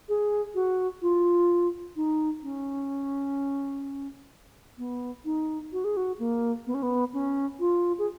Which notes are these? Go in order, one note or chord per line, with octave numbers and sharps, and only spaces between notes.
G#4
F#4
F4
D#4
C#4
B3
D#4
F#4
G#4
F#4
A#3
B3
C#4
B3
C#4
F4
G#4